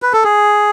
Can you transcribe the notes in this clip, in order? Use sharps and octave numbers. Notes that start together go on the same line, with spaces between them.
B4
A4
G#4